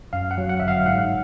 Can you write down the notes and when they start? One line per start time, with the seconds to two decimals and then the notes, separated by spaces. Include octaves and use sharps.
0.13 F#2 F5
0.31 F#5
0.38 F#3
0.49 F#5
0.60 G1 E5
0.68 F5
0.86 G#2 F#5